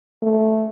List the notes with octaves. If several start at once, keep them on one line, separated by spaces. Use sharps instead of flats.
A3